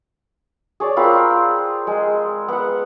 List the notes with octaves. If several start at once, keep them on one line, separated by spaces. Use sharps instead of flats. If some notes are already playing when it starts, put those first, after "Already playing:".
G#4 C#5 D5
C4 F4 A#4 B5
G#3
B3 F#5